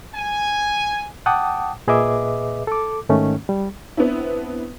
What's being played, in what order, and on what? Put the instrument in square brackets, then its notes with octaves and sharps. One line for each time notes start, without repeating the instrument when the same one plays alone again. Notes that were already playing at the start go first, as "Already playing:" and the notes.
[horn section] G#5
[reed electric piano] F#5 G5 A5 D6 D#6
A#2 G#4 B4 D#5 E5 D6
A4 D6
G#2 D#3 A3 C#4
G3
[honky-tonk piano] B3 C4 D4 E4